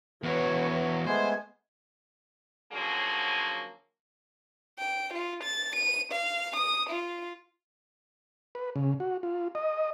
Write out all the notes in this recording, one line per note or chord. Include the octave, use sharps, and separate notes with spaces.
E2 F#4 B4 C#5
G#3 A3 B3 C5 G#5
D3 F3 F#3 A#3 C#4 G#4
G5
F4
A6
D#7
F5
D#6
F4
B4
C#3
F#4
F4
D#5